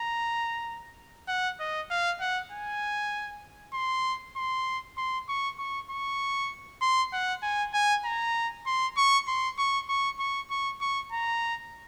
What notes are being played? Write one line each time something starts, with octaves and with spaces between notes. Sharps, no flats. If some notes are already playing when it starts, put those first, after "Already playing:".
Already playing: A#5
F#5
D#5
F5
F#5
G#5
C6
C6
C6
C#6
C#6
C#6
C6
F#5
G#5
G#5
A#5
C6
C#6
C6
C#6
C#6
C#6
C#6
C#6
A#5